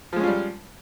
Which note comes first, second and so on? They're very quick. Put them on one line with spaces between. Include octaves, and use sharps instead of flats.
F3 G#3 C#4 F4 G3